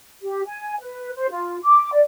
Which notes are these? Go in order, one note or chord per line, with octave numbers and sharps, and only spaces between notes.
G4
G#5
B4
C5
F4
D6
D5